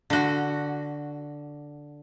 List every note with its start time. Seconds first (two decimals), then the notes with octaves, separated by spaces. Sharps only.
0.10 D3 F#4